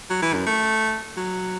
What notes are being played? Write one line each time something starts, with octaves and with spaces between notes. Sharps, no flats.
F#3
E3
F#2
A3
F#3